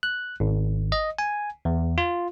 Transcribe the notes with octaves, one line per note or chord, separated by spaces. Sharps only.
F#6
G#1
D#5
G#5
E2
F4